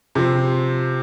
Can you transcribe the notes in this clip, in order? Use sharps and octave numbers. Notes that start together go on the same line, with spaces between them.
C3 F3 C4